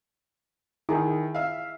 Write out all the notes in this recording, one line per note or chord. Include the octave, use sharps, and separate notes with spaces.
D#3 E4 G#4
E5 F5